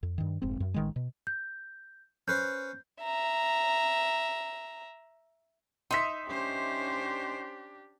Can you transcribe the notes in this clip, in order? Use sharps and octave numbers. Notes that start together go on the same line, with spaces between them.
F2
G2 D#3
F1 G#2 C4
F#2
A1 D#3 G#3
B2
G6
C#4 B4 C5 G6
E5 A#5
D#4 E5 C6 B6
C#4 D4 G4 C5